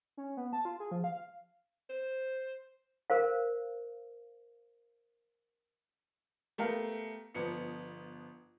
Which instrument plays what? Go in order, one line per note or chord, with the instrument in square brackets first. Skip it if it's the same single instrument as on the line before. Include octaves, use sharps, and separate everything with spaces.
[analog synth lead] C#4
B3
A5
F4
G#4
F3
F5
[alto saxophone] C5
[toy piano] A#4 C5 F5
[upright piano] A3 B3 G4 A#4 F5
G1 F3 B3 C#7